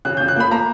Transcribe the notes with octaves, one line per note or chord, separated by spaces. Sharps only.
C#3 F#6
G6
C#3
F#6
A#3 B5
A#3 A#5